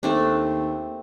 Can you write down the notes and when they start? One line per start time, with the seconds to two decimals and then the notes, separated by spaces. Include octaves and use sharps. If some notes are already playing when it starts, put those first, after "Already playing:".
0.03 D#2 A3 C4 D4